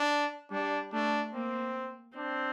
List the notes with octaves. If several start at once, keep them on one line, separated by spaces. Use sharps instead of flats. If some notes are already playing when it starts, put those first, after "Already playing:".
Already playing: D4
G3 D4
A3 D4
A#3 C4
C4 D4